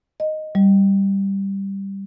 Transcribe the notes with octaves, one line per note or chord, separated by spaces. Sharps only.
D#5
G3